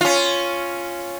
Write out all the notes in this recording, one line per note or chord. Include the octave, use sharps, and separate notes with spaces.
C#4 F4